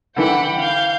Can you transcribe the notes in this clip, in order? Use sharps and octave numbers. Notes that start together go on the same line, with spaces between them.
D3 E3 F#5 G5 B5
F5 G6